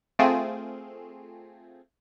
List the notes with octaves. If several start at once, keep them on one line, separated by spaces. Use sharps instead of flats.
A3 C4 F4 G#4